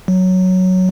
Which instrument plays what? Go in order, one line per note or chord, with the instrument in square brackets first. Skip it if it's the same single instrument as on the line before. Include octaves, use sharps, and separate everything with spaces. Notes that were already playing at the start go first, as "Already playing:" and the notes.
[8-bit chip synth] F#3